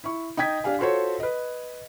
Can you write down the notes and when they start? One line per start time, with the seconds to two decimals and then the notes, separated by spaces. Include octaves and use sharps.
0.04 E4 C#6
0.37 D#4 D#5 G5 G#6 B6
0.64 D4 G4 F5 G#5
0.79 F4 F#4 A4 C5 C#5
1.20 B4 D#5